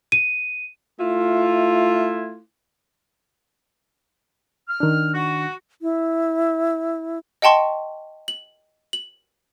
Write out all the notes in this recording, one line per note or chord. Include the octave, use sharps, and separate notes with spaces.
D#7
A3 E4 F4
F6
D#3 D4
F#4
E4
D#5 F#5 G5 A5 C6 C#6
F#7
F#7